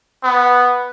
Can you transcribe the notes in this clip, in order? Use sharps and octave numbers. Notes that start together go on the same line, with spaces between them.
B3